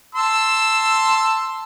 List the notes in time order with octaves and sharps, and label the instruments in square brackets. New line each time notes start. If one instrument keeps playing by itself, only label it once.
[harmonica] A5 C6 E6